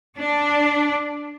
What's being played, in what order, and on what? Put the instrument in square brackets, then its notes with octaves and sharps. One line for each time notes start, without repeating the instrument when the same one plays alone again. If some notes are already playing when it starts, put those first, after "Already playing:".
[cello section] D4